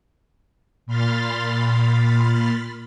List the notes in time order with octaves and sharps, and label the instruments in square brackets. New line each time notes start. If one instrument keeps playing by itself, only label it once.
[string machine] A#2 B5 C6 F6 A6